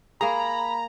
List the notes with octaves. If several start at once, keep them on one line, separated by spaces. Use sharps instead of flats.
A#3 G#4 A#5 B5